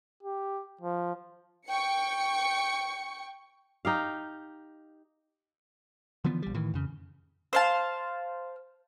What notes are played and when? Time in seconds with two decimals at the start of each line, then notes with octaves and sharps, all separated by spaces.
0.23 G4
0.81 F3
1.68 G5 C#6 C#7
3.85 D#4 G4 F5
6.24 D3 E3 F3 B3
6.42 A#1 G3
6.54 A2 D#3 E3
6.74 F2 C#3
7.53 C5 F5 A5